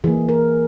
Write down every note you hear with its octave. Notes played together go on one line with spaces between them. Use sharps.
E3 A#3 G#4
A#4